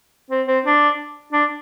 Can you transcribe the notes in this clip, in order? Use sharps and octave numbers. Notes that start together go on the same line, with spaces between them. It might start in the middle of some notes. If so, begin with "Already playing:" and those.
C4
C4
D4
D4